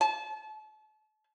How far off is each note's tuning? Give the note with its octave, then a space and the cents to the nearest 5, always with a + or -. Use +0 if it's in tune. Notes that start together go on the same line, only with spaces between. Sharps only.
A5 -35